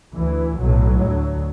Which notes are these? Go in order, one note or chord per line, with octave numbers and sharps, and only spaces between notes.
D2 E3
B1 A2 F#3
D2